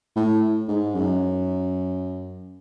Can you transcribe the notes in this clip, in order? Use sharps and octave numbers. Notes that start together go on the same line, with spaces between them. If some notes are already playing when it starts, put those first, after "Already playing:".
A2
G#2
F#2